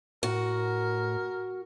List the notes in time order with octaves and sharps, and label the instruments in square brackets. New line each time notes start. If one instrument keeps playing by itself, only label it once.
[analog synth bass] A2 [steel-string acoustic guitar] F#4 [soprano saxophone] A#4